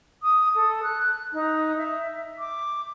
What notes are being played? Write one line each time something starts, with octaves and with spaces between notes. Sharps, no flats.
D#6
A4
F#6
D#4
E5
D6